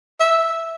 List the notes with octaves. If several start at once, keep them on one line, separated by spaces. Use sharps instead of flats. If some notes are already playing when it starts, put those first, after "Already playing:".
E5